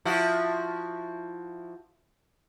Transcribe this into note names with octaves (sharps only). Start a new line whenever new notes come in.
F3 E4 F#4